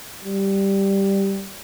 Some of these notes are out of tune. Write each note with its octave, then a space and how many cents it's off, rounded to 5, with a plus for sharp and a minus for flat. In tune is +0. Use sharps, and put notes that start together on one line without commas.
G3 +0